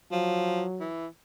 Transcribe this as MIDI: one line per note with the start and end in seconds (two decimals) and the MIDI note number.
0.12 0.64 53
0.12 0.87 54
0.80 1.07 52